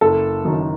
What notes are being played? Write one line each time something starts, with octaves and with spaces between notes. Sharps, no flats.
F#1 A4
F#2 D#3